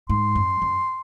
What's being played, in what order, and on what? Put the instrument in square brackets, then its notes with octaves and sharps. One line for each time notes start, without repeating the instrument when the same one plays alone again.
[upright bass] G#2 [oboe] C6
[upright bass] F#2
F#2